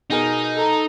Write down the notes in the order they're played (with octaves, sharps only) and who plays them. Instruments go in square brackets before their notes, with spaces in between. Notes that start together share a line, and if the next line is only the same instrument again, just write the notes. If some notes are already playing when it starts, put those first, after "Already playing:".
[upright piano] B2 G#4 A#4 [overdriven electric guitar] D#4
[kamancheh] A4 A#5